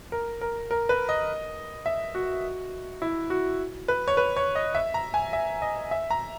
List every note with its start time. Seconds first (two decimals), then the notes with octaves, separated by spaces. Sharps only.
0.12 A#4
0.41 A#4
0.71 A#4
0.89 B4
1.09 D#5
1.86 E5
2.15 F#4
3.02 E4
3.30 F#4
3.88 B4
4.08 C#5
4.17 B4
4.36 C#5
4.55 D#5
4.75 E5
4.94 A#5
5.14 G#5
5.33 E5
5.62 D#5
5.91 E5
6.10 A#5